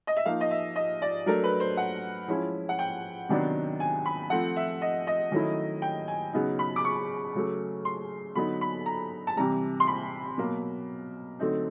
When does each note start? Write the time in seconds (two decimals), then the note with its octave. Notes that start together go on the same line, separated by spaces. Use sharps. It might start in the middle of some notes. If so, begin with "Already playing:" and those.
0.07 D#5
0.17 E5
0.25 F3 A#3 D#4 F5
0.41 D#5
0.51 E5
0.76 D#5
1.02 D5
1.26 F#3 A3 D4 A#4
1.44 B4
1.60 C5
1.77 F#5
2.28 F3 G#3 C#4 E4
2.69 F#5
2.79 G5
3.29 C3 D#3 F#3 B3 D4
3.80 G#5
4.06 B5
4.30 F3 A3 C4 F#5
4.56 E5
4.82 D#5
5.07 D#5
5.32 D#3 F#3 A3 C#4 E4
5.82 G5
6.08 G#5
6.33 C#3 F#3 B3 D#4
6.59 B5
6.76 D6
6.85 C#6
7.35 C#3 F#3 A3
7.85 C6
8.35 D3 F#3 B3 D#4 B5
8.61 B5
8.86 A#5
9.27 A5
9.37 C3 E3 G3 A#5
9.80 C6
9.87 B5
10.38 B2 F#3 A#3
11.39 D3 F#3 A3 C4 D#4